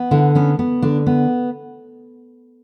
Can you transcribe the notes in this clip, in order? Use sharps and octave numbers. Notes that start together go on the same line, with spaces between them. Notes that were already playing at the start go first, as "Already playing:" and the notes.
Already playing: B3
D3 E4
B3 C#4
B3
D3 D4
B3